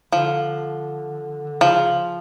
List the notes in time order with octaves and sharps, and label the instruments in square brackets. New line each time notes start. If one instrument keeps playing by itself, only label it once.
[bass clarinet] D3 [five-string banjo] F3
[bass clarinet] C#3 [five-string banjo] F3